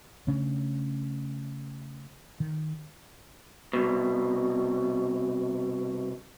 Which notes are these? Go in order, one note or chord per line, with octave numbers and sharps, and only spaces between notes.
C#3 A3 C#4 D4
D#3
C2 B2